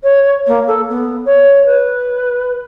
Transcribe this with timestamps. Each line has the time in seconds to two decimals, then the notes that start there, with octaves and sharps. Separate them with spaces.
0.03 C#5
0.47 A#3
0.67 A4
0.89 B3
1.25 C#5
1.65 B4